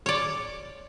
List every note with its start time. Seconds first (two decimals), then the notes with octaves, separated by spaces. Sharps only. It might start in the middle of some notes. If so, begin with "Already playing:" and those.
0.06 C#5 D5